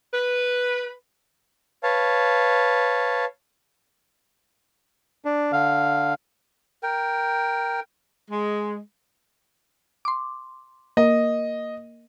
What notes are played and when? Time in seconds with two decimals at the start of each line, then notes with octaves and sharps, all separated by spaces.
0.14 B4
1.83 B4 C#5 F5 A5
5.25 D4
5.52 D3 F5
6.83 A#4 G5
8.30 G#3
10.05 C6 D6
10.97 A#3 A#4 D#5